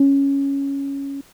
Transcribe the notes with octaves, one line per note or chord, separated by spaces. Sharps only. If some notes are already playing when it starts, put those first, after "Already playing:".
Already playing: C#4